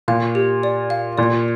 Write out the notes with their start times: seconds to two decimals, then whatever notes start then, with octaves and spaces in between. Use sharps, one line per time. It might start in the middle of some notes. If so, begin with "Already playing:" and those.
0.08 A#2 F5
0.35 G4
0.63 D5
0.90 F5
1.18 A#2 D5